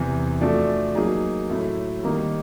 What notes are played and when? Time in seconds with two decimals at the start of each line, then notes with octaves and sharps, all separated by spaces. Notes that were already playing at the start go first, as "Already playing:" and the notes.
Already playing: E2 C3 E3
0.41 F3 A3 D4 F#4 A4
0.95 F#3 A#3 D#4 G#4
1.50 A2 F#3 A3
2.03 D#3 G3 A#3 D#4